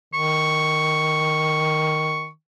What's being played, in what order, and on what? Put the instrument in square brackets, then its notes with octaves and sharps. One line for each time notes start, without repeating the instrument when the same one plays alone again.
[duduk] D#3 [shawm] C#6